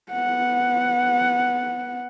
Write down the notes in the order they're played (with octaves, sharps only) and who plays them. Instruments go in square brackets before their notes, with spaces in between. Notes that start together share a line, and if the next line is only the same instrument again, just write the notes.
[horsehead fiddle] B3 F#5